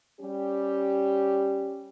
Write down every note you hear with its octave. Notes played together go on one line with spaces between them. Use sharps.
G3 C#4 G4